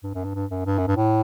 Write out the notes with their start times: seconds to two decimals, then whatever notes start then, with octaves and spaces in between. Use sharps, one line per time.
0.04 G2
0.15 F#2
0.25 G2
0.35 G2
0.51 F#2
0.66 G2
0.78 F#2
0.88 G2
0.97 A2